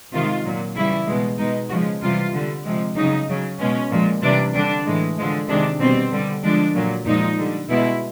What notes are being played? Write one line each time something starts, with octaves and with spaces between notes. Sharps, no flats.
C3 D#3 G#3 F4
A#2 F#3
C#3 E3 G3 E4
B2 G#3
B2 G#3 D#4
C#3 F3 G#3 F#4
C3 E3 G3 F4
D3 G3
C3 F3 G#3
C#3 F#3 D#4
C#3 F#3
B2 G#3 C#4
A#2 F3 G#3
C3 E3 G3 D4
D3 G3 D4
A2 E3 G#3
D3 F3 G#3
C3 D#3 G#3 D4
B2 G3 C4
D3 G3
D3 F3 G#3 D4
A#2 F#3
A#2 F3 G#3 D#4
D3 G3
B2 G#3 E4